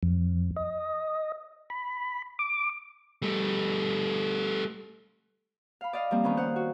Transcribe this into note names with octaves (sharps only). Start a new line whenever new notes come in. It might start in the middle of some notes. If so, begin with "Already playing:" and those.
F2
D#5
B5
D6
G3 A3
F5 B5
D5 D#5 F5
F3 G3 A#3 C4
D#3 F3 B3 C#4 D#4
C5 F5 F#5
F#4